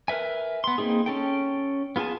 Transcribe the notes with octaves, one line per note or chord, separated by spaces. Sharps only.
A#4 B4 E5 G#5
B3 C6
A#3 C4 D#4 G#4
C#4 A4 G5
B3 F4 G#4 G#5 A5